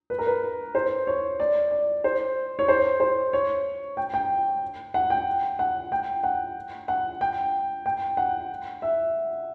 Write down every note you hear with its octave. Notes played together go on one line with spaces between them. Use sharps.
B4
A#4
B4
C5
C#5
D5
D5
C5
C#5
C5
C5
C#5
G5
G5
F#5
G5
F#5
G5
F#5
F#5
G5
G5
F#5
E5